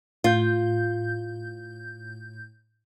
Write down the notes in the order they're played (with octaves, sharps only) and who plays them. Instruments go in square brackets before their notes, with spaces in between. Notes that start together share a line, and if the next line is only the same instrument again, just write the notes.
[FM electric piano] A2 G6 [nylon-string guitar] F4